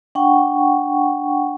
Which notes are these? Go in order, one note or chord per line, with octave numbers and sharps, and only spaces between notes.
D4 F#5 G5 C#6